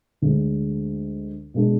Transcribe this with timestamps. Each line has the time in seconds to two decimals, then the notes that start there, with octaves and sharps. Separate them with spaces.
0.22 D2 D3 G#3
1.54 B2 G#3 D4